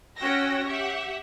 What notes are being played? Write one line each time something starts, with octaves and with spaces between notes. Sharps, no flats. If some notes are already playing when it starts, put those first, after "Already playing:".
C#4 F#4 G5 E6 A#6
G4 E5 F#5